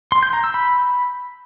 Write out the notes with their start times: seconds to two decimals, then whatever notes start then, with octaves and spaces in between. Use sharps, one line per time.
0.12 C6
0.23 G6
0.33 A#5
0.44 E6
0.54 B5